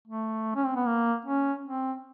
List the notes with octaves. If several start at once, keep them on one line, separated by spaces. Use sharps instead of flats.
A3
C#4
C4
B3
A#3
C#4
C4